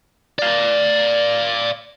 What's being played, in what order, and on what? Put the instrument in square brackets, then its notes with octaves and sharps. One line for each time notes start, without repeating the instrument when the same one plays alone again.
[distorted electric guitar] D5 F5